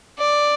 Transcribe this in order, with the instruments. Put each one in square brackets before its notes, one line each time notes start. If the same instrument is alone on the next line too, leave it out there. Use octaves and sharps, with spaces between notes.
[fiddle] D5